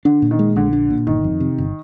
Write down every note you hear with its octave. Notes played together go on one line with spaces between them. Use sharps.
D3 D4
A#2
D#3
G#3
A#1 D3
D4
A#2
G1 D#3
F2
C3
G1